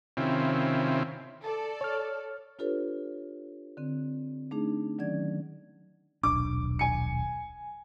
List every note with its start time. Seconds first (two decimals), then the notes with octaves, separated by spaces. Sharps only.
0.17 C3 D#3 C4 C#4 E4 F4
1.42 A4 D5
1.81 C#5 F6
2.59 D4 F4 G4 A4 B4 C#5
3.77 D3 C4
4.51 A3 D4 D#4 G#4
4.98 D#3 F#3 C#4 D5 G#6
6.23 D#1 B1 D4 D6
6.79 G#5 C#7